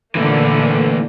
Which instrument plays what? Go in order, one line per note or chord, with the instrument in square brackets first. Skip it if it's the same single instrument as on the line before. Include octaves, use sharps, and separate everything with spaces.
[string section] A#2 D3 A#3 [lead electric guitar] E3 A3